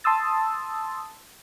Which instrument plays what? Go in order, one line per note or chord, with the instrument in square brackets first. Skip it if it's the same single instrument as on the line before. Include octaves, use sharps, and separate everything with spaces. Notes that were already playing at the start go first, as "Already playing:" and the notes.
[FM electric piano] A5 C6 D#6 E6 A6